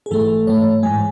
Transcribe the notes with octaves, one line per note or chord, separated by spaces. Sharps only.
G#4
G#2 E3 A3 A4
G#2 E3 A3 C#5
G#2 E3 G#3 G#5